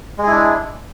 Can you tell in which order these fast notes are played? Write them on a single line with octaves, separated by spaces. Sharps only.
G#3 G#4 E4 D4